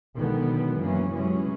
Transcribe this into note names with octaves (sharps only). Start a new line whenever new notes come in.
B2 D3 D#3 F#3 G#3 B3
F#2 E3 F#3 A#3 C#4
C3 E3 F#3 G#3 C#4